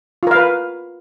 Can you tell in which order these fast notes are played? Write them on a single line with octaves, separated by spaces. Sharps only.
F4 A#4 F5 B4